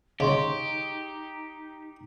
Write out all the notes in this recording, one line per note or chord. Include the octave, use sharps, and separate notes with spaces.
C#3 D#4 G4 D#5 C6 C#6